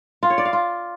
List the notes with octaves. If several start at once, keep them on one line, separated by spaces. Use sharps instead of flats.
F4
C#5
D5
F5
F4